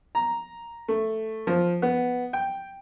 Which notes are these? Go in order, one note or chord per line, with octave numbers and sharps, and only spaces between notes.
A#5
A3
F3
B3
G5